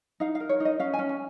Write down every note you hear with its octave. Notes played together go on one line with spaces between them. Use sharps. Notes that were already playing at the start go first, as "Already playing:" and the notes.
D#4 F5
F5
A#4
C#5
D#4
D#5
C#4 F5
G#5
C#4
G#5